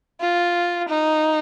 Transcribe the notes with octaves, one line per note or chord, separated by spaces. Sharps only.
F4
D#4